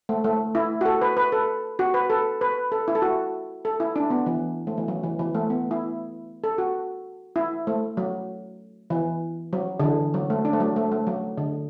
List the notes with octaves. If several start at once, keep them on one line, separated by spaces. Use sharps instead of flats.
A3
A3
E4
F#4
A4
B4
B4
A4
F#4
B4
A4
B4
A4
E4
A4
F#4
A4
E4
D4
B3
E3
A3
E3
F#3
E3
E3
A3
B3
E4
A4
F#4
E4
A3
F#3
E3
F#3
D3
E3
F#3
A3
D4
A3
F#3
A3
A3
F#3
D3